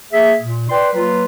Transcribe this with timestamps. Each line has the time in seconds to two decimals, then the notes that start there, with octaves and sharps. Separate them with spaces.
0.12 A#3 G#4 E5
0.39 A#2
0.69 B4 D5 G5 C6
0.93 F#3 A#3 F4 B4